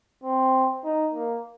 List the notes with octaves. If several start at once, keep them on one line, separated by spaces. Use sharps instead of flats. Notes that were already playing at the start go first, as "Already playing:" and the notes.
C4
D#4
A#3